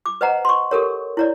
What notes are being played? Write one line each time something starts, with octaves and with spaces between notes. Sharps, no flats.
D6
B4 C5 D#5 F#5 A#5
C6 C#6
G4 A4 A#4 C#5
E4 C#5 D5